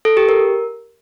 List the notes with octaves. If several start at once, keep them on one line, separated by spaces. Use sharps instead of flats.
A4
G4
A#4